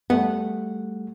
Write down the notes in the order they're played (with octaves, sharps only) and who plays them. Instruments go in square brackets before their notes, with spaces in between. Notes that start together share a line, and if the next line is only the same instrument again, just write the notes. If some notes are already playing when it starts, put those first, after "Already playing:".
[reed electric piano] G3 A3 [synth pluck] B3 [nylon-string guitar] F#5